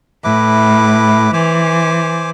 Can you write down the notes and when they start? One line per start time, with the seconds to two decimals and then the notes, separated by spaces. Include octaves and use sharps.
0.24 A2 E4 B4 D6
1.34 E3 C5 G#5 D6